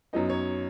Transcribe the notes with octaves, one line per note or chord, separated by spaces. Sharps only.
F#2 F#3 B3 D#4 D#5
C#5